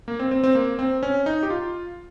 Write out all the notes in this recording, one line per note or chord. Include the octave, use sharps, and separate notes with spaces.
A#3
C4
C4
C4
A#3
C4
C#4
D#4
G4
F4